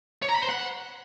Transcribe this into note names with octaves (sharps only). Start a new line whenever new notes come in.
C#5
A#5
B5
C5
F#5